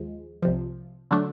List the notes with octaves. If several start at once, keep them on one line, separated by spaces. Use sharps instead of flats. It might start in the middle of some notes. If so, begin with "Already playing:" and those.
Already playing: D#2 F3 G#3
C2 C3 F3
D3 F#3 A3 D4